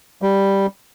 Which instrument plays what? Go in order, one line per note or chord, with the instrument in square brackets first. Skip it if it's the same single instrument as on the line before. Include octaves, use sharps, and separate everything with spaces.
[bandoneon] G3